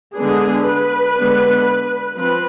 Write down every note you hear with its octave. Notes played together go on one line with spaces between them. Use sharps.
D3 G#3 B3 D4 G#4
B4
D3 G#3 B3 D4
F3 C4 B4